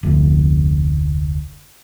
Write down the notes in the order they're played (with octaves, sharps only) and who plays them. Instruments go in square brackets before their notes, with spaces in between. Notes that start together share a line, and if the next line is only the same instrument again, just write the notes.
[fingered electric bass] F1 D2